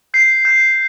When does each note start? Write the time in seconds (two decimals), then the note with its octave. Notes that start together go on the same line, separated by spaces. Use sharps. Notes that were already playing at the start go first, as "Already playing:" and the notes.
0.14 G6 C7
0.45 G6